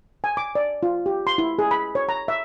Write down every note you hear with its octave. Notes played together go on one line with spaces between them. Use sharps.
G#5
D6
D5
F4
G4
C6
E4
G#4
B5
C#5
A#5
E5